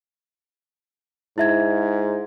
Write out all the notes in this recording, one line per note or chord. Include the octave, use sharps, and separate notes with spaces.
G#2 E4 E5 G#6